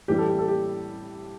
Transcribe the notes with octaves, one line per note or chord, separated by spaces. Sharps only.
A2 E3 G3 G4
A4
G4
A4
G4